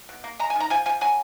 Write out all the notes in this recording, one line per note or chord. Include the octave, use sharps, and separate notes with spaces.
B2
A#3
G#3 A#5
G#5
D#3 A#5
F3 G#5
F3 G#5
F#3 G#5